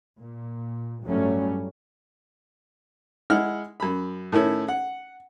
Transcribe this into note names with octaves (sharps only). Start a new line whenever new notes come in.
A#2
A1 G2 F#3 G3 A3 C#4
G#3 E4 F#5 F6
F#2 B5
A2 D#3 C#4 E4
F#5